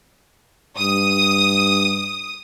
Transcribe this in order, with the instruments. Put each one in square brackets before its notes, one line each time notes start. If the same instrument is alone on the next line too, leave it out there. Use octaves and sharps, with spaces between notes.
[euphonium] G2 [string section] D#6